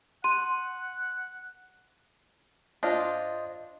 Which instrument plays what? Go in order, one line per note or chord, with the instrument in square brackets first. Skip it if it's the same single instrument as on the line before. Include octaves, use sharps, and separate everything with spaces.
[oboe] F#5 [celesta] C6 D#7
[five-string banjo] D4 F4 [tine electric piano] C5 D#5